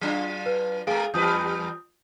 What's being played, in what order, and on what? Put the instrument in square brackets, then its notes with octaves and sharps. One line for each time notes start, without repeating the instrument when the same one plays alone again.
[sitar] F#3 D4 F4
[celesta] B4
[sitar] G#3 A3 [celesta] G#4 F5
[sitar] E2 G3 B4 [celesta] F4 D#6 G6